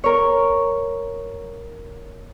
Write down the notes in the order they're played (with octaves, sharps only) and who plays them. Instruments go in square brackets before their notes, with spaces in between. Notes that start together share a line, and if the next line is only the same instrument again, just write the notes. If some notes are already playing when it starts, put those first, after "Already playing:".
[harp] A#4 C#5